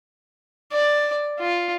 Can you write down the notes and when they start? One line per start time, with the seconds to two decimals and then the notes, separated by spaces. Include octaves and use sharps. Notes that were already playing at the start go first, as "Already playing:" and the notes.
0.72 D5
1.40 F4